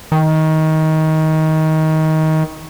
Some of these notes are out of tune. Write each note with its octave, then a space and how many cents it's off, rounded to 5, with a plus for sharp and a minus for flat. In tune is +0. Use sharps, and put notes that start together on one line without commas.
D#3 +20